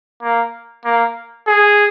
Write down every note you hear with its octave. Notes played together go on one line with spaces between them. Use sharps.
A#3
A#3
G#4